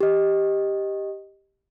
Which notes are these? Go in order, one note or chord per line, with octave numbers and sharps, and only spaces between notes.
G4 D#5